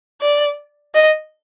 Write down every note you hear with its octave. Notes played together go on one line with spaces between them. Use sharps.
D5
D#5